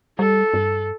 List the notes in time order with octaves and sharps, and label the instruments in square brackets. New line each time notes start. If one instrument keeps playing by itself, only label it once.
[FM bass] G3 [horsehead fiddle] A4
[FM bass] G2